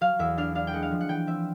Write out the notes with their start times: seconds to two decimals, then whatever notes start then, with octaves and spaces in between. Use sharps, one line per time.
0.01 F#3 F5
0.19 E2 E5
0.37 D4 F5
0.55 D4 F5
0.67 G5
0.73 G#3 F#5
0.83 F5
0.91 F3
1.01 F#5
1.09 E3 G5
1.27 C4 E5